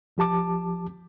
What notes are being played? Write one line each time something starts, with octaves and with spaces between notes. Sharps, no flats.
C2 F3 G4 A5 D6